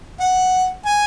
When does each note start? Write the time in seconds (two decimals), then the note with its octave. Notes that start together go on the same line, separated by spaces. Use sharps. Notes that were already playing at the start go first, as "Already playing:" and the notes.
0.20 F#5
0.85 G#5